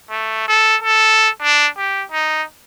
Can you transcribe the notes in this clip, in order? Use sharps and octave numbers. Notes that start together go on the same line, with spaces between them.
A3
A4
A4
D4
G4
D#4